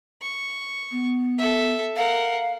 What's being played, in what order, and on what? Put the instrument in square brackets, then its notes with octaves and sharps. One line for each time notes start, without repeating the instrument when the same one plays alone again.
[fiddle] C#6
[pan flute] B3
[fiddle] A4 E5
[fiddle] A#4 F#5 [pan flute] F5